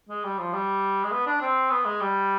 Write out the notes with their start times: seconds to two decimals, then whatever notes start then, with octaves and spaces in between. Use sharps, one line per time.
0.09 G#3
0.24 G3
0.38 F3
0.53 G3
1.04 G#3
1.12 B3
1.27 D4
1.41 C4
1.71 B3
1.86 G#3
2.01 G3